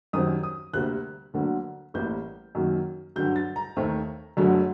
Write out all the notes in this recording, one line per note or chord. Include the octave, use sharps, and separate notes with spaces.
F#2 D#3 G3 C4 D#6
D#6
D2 C3 G3 A#3 F#6
D2 D3 F#3 A#3
A1 A2 G3 A#3 G6
F#2 D#3 F#3 A#3
G2 D3 F#3 G6
A6
A#5
D#2 D#3 A3 C4
F#1 F#2 D3 F#3 A3